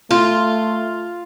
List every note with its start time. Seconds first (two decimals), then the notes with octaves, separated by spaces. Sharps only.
0.11 A3 F4